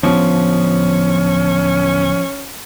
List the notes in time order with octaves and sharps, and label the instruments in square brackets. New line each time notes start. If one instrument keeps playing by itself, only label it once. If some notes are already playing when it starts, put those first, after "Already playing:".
[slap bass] D1 B3 D4 [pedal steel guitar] F3 [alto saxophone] C#4